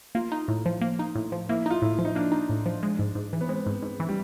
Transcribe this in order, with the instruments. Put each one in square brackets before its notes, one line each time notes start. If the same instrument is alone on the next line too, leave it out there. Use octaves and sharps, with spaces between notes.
[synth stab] A#3 [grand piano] F4
[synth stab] D#4
A2
F3
A#3
D#4
A2
F3
[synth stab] A#3 [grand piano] E4
[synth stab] D#4 [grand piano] F4
[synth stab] A2 [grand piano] E4
[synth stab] F3
[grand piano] D#4
[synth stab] A#3 [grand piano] D4
[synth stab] D#4
A2
F3
G#3
G#2
G#2
E3
[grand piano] B3
[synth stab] G#3 [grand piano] C4
[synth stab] G#2
G#2
E3
[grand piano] G3